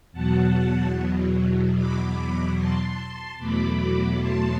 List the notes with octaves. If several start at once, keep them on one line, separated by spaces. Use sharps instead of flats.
E2 B2 F#3 F#5 A5
B5 D6
A5 C6
E2 B2 F#3 A3 B5 D6
A5 C6